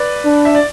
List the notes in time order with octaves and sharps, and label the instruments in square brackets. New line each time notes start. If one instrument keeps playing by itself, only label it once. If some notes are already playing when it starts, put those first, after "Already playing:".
Already playing: [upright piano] B4 D5
[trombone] D4
[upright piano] E5
D5